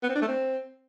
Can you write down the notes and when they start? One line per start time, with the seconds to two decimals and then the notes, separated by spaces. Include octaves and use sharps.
0.03 B3
0.09 C4
0.15 D4
0.22 A3
0.28 C4